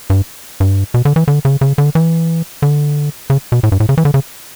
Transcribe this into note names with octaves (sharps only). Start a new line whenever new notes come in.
G2
G2
B2
D3
E3
D3
C#3
C#3
D3
E3
D3
C#3
B2
A2
G2
A2
C#3
E3
D3
C#3